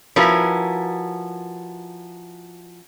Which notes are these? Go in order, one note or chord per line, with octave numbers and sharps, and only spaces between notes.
F3 C#4 E4 F#4 A#4 B4